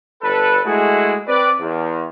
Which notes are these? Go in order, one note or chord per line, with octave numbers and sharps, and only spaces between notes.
G1 A4 B4
G#3 A3 E4 F#4 G#4
C4 B4 D5
E2